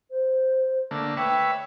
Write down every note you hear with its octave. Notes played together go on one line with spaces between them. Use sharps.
C5
D3 A3 A#3
B4 C#5 E5 G5